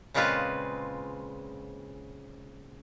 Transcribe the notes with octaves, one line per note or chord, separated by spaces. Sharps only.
A#2 C#3 G#3 C4 F4 B4